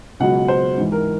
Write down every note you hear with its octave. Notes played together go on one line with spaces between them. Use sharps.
C#2 B2 F#3 F#5
C5
G#2 E3
A#4